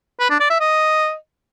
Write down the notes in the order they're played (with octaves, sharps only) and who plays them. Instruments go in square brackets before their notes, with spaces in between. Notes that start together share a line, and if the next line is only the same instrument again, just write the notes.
[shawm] B4
D4
D5
E5
D#5